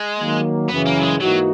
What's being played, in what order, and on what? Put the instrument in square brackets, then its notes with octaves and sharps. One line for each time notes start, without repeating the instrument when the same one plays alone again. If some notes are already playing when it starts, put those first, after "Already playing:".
Already playing: [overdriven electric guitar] G#3
[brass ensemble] D#3 F#3 A#3
[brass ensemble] F#2 C#3 E3 [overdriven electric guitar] B3
[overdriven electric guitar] A#3
F#3
G#3
[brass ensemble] G#2 E3 A#3 D#4 F#4 [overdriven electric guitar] F#3